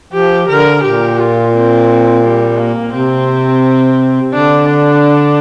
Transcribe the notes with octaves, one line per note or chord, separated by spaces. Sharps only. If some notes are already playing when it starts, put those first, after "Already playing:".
F3 G4
D3 A#4
A#2 G4
F4
C4
G3
A#3
C3 C4
D3 D4
D4